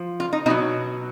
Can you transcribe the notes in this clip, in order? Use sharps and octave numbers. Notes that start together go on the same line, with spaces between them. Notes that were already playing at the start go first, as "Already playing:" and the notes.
Already playing: F3
F4
D#4
B2 F#3 D#4